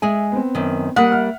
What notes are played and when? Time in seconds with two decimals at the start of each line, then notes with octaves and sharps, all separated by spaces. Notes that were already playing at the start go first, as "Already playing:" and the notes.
0.02 G#3 G#4 E5 G#5
0.32 B3 C4
0.55 F#2 D#3
0.96 G3 A#3 F#5 D#6 B6
1.12 E5 F6